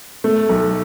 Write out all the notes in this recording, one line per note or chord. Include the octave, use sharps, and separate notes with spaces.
A3
B1